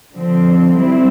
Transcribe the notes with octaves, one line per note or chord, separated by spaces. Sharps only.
D3 F3 C4
G3 C4 E4